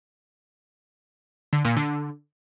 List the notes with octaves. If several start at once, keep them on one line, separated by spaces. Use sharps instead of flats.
D3
A#2
D3